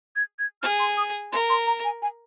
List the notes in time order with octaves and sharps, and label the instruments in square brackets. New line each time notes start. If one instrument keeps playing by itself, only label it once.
[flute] G#6
G#6
[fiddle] G#4 [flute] F6
[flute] C6
D#6
[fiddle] A#4 [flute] C6
[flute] C6
A#5
G#5
G#5